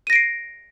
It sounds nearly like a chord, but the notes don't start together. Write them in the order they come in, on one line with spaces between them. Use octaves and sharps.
D#7 A#6 D7 C7